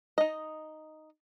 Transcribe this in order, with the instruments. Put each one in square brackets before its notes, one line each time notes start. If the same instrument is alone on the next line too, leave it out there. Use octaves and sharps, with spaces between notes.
[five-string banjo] D#4 D#5